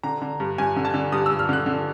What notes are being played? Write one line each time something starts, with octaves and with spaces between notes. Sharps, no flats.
D3 A#5
D3
G2
G2 G#5
D3
A5
D3
G2 D#6
E6
G2
F6
D3 F#6
D3